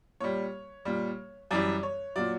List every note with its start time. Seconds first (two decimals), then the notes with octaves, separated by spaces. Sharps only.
0.20 A#2 G3 C#5
0.85 A#2 G3
1.51 F#2 E3 G3 D5
1.83 C#5
2.16 A#2 F#3 D5